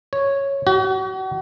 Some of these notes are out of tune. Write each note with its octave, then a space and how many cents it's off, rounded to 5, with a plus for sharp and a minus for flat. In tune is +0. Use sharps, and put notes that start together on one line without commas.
C#5 -5
F#4 +40